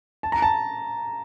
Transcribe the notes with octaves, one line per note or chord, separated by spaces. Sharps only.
A5
A#5
A5